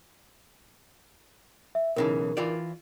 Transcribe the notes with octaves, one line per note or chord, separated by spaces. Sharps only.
E5
B1 C#3 E3 D#4 A#4
E3 F4 D5